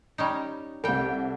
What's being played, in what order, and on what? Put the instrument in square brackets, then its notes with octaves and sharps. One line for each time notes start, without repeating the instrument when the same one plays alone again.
[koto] G3 C#4 D#4
[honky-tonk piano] C2 A4 [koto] G3 G5